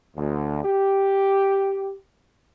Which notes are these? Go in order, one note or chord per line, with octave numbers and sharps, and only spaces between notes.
D2
G4